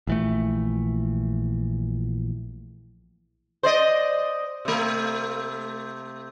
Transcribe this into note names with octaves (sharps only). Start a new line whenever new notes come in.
A#1 E3 A3
C5 D5 D#5
C3 A3